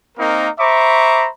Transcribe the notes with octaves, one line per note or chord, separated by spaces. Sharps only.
A#3 C4 D#4 A#4
C5 E5 A#5 B5 C#6 D6